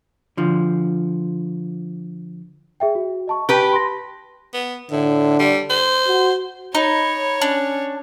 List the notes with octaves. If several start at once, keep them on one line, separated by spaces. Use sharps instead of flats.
D3 F3
G#4 E5 G5
F#4
D#5 A5 C#6
G4 B4 G5 A5 D7
C6 A#6
B3
A2 D3
G3
C5
F#4
D#4 C#5 B5
C#4 D4